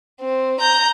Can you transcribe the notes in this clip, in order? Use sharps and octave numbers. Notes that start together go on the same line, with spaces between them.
C4
A#5 G6